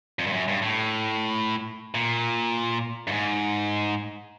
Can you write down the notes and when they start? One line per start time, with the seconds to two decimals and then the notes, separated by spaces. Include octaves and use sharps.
0.19 F2
0.26 G2
0.33 F#2
0.48 G2
0.62 A2
1.95 A#2
3.07 G2
3.12 G#2